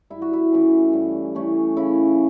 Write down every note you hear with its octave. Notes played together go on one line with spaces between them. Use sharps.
G2 E4
F#4
E4
E3 A3 C#4
G2
E3 A3 C#4
C#3 E4